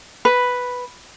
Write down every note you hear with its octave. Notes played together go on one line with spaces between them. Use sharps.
B4